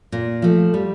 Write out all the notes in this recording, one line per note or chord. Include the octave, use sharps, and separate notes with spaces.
A#2
F3 A3
G3